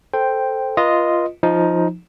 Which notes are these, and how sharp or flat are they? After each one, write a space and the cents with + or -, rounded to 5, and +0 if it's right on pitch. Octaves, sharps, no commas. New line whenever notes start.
A4 +0 C5 +0 G5 +0
F4 -10 B4 -40 D#5 +0
F3 +0 D#4 +10